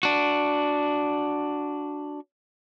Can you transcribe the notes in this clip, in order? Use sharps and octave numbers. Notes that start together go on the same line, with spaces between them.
D4 F#4